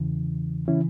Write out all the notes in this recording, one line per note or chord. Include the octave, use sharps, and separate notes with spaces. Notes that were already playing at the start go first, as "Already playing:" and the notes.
Already playing: E2 C#3 E3
C#3 E3 C#4 E4